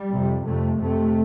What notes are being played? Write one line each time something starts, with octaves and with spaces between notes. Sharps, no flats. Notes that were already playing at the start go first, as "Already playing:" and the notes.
Already playing: G3
F2 C3
F2 C3 A3
F2 C3 A3